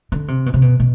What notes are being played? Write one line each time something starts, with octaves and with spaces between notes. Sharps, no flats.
D3
C3
B2
C3
B2
B2